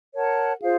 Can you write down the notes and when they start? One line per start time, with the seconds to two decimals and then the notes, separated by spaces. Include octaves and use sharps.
0.14 A#4 C#5 F#5 A5
0.61 F4 G#4 C5 F5